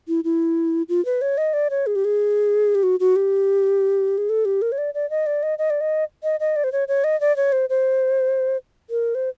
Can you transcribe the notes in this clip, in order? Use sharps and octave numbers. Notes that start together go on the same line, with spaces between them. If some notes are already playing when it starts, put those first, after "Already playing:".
E4
E4
F4
B4
C#5
D#5
D5
C#5
G#4
G4
G#4
G4
F#4
F#4
G4
G#4
A4
G4
A#4
C#5
D5
D5
D#5
D5
D#5
D#5
D5
D#5
D#5
D#5
D5
C5
C#5
C#5
D#5
D5
C#5
C5
C5
A#4
C5